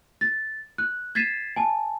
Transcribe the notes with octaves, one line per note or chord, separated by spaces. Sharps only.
A6
F#6
G#6 A6 B6 C7 D#7 E7
G#5 A5